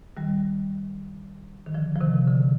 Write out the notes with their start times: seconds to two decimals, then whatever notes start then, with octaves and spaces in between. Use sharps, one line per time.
0.17 D#3 G3
1.66 D#3
1.74 D3 F3
1.96 F3
2.01 C3 D#3
2.28 D3